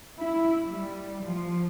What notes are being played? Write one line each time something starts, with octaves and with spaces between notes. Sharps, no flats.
E4
G3
F3